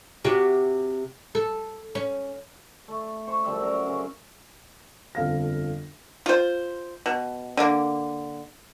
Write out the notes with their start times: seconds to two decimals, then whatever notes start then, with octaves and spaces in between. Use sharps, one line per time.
0.25 C3 F#4 G4
1.35 A4
1.95 C#4
2.88 A3
3.27 C5 C#6
3.44 F#2 F3 G3 E5
3.61 F#3 A#4
3.86 C#3 C#4
5.15 G1 F2 F5 A#6
6.26 F4 C5
7.06 B2
7.57 D3 A#3